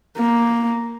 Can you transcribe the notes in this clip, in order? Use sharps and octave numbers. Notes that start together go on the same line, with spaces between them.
A#3